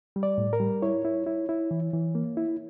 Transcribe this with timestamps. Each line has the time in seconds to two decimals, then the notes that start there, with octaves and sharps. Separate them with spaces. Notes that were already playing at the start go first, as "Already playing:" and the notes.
0.16 G3
0.23 D5
0.38 A2
0.53 A#4
0.60 G3
0.82 E4 C#5
1.05 E4
1.27 E4
1.49 E4
1.71 E3
1.93 E3
2.15 A#3
2.37 E4